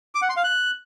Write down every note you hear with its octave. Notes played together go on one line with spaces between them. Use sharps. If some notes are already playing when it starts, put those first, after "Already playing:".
D6
F#5
C6
F5
F#6